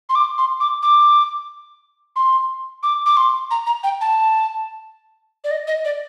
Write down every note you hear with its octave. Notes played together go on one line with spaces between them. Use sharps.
C6
D6
C6
D6
D6
C6
D6
D6
C6
A#5
A#5
G5
A5
D5
D#5
D#5
D5